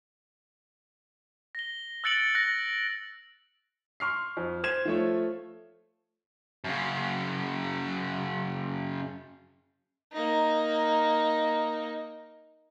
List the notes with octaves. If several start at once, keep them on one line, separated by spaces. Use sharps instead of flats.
A#6 G7
E6 F#6 A6 C#7 D7 F#7
F#6 A#6
C6 C#6 F6 C7
F2
C5 G#6 E7
F3 A3 C#5
F#2 C#3
A#3 D#4